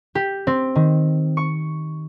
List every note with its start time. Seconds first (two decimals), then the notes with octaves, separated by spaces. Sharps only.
0.15 G4
0.47 C4
0.75 D#3
1.37 C#6